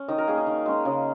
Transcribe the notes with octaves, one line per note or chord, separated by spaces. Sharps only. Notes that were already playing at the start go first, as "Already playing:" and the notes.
Already playing: C#4
D#3 D#5
A#4
A#3 C#4 G#4
G#4
D#3
G#3 C#4
C#3 G#4